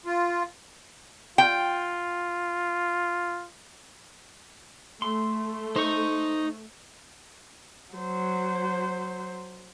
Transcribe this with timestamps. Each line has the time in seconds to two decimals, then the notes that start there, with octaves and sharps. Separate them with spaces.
0.06 F4
1.38 F4 G5
5.02 A3 C6
5.76 D#4 C5 C#6
7.94 F#3 C5